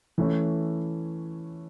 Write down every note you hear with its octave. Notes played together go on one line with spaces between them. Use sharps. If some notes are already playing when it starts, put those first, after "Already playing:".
E3 A3 C#4 E4